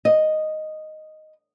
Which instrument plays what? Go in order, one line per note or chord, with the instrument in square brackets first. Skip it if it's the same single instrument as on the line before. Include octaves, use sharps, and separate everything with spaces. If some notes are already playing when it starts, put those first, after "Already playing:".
[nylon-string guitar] D#5